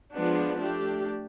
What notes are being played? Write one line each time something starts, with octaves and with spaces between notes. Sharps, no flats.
F3 G#3 B3 D4
A3 D4 G4